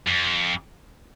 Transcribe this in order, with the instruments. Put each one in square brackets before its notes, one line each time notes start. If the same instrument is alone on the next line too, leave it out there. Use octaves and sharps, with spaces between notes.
[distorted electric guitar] F2